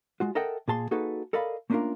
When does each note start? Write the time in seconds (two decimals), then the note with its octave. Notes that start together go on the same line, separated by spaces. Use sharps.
0.20 G#3 F4 F#4
0.35 A4 A#4 D#5 E5 F#5 G5
0.68 A#2 G#4 A5 C6
0.91 A#3 D#4 F#4 G#4 A4 B4
1.33 A4 A#4 D5 D#5 F5 B5
1.70 A3 A#3 C#4 D4 F4 A#4